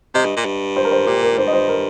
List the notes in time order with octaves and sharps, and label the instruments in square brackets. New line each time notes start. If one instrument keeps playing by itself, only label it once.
[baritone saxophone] C3 [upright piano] D#5
[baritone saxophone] G2
A#2
G2
[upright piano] C5
A#4
C5
[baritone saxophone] A#2 [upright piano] G4
[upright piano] A#4
[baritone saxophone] G2 [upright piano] C5
[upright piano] D#5
C5
A#4